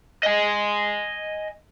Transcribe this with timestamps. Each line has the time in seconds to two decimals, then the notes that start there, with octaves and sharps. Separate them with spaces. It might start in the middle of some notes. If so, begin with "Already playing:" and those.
0.23 D#5 G#5